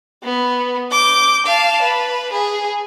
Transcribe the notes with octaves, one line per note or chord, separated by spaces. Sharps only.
B3
D6 G6
F5 A5
B4
G#4